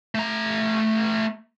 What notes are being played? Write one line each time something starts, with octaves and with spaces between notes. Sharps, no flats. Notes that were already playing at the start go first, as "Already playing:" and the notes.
A3 A#5